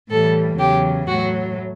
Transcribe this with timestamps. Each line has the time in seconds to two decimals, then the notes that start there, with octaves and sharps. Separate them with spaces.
0.10 A2 E3 G3 A4
0.58 E2 C#3 F#3 G4
1.07 A2 F#3 F#4